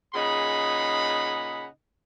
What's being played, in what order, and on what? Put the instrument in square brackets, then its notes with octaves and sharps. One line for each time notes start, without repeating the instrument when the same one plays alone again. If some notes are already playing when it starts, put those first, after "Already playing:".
[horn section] A#2 C#3 D#4 G#4 F#5 B5